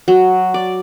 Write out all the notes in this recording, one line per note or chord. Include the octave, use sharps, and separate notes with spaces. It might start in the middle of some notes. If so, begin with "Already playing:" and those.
F#3
D5